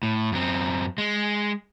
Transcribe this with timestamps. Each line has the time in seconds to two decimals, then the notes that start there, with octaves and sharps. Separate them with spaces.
0.03 A2
0.32 F#2 C4
0.98 G#3